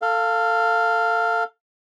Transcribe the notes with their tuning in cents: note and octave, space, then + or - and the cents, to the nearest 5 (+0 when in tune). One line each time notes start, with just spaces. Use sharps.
A4 +25 F5 +0